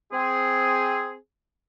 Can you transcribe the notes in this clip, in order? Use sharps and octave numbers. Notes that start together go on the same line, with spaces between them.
C4 G#4